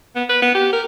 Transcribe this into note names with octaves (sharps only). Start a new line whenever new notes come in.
B3
B4
B3
G4
A#4